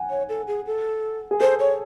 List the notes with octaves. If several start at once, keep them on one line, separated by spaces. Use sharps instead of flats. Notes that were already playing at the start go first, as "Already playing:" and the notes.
Already playing: F#5 G#5
C#5
A4
G#4
A4
G#4
A4 C5
C#5